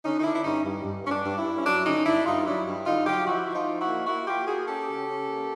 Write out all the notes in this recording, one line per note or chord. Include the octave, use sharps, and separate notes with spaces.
D3 C#4 D#4
D#4
D3 D4 E4
E4
G2 C#4 D#4
G2
G2
G2 C#4
D4
G2
D4 E4
G2
C#4
F#3 D4
D3 C#4 D#4
G2 D4 E4
G2 D#4 F4
F#3 D4 E4
G2
D3 D#4 F4
F#3 F4 G4
F3 E4 F#4
F3
D#4 F4
F3
E4 F#4
A#3
A#3 E4 F#4
A#3 F4 G4
A#3 F#4 G#4
C#4 G4 A4
C#3
C#4
A#3